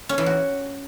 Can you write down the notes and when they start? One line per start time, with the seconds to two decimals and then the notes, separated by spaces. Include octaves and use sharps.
0.09 C#4
0.18 E3
0.26 F#4